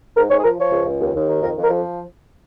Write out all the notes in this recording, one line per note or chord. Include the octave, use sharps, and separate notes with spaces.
G#2 A#4
G#2 C#5
G#4
F3 A#4
F3 C#5
C#2
C#2
D#2
D#2
D#3
F2 A#4
F2
A#4
F3